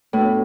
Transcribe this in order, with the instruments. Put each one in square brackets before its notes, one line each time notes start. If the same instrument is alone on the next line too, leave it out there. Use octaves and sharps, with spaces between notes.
[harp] A2 [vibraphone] B3 D4 F#4 B4